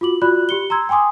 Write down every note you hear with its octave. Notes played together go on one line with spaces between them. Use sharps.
F4 F#4 D6 F#7
F4 F#4 D5 B5 F#6
G4 C#7 G7
A#5 C6 E6 G#6
G5 G#5 C6 D6 D#6